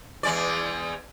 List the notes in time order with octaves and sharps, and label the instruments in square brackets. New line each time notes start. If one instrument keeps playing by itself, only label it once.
[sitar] E2 G#3 D5